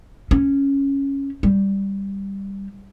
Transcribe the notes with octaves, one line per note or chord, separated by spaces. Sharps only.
C#4
G3